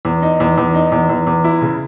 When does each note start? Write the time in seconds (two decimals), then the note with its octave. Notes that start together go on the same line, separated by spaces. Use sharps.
0.05 E2
0.22 D#4
0.40 E2
0.58 E2
0.74 D#4
0.92 E2
1.09 E2
1.27 E2
1.44 E4
1.62 C#3